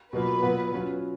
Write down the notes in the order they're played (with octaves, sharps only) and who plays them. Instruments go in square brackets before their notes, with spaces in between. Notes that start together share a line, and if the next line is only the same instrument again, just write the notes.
[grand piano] B2 F#3 A#3 F4 [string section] B4
[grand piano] A#2 F#3 B3 F4
F#3 C#4 F4